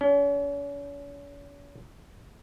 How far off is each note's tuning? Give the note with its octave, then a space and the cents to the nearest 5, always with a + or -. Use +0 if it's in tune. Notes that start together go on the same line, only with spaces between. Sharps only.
C#4 +40